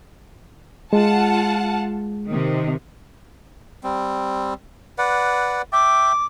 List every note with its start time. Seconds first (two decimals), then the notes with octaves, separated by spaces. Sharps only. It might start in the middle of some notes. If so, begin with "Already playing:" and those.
0.93 G#3 F4 F#5 A5
2.28 C3 D#3
3.84 G3 C4
4.98 B4 D5 F#5
5.73 E5 G5 D6